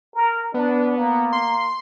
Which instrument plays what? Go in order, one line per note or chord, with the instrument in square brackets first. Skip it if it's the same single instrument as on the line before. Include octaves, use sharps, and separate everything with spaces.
[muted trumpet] A#4
[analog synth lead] B3 [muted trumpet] D4
[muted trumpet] A#3
[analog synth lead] C6